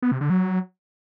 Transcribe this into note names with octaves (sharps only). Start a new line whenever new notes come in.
B3
C3
D3
F#3